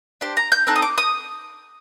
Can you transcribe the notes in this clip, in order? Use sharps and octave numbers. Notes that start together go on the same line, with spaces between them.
D4 G4 C5
A#5
G6
C4 D#4 A4 F#6
D#6
D6
D#6